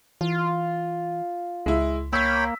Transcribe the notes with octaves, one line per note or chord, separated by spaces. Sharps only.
E3 F4
C#2 G#3 E4
A#3 C#5 G5 B5 E6 B6